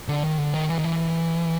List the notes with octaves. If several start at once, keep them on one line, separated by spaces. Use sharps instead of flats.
D3
D#3
D3
D#3
E3
D#3
E3